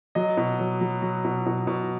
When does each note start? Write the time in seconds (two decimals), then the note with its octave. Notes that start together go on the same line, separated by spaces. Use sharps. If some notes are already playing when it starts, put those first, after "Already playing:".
0.15 F#3 D#5
0.37 B2
0.59 F#3
0.81 F#3
1.02 F#3
1.24 B2
1.46 B2
1.67 B2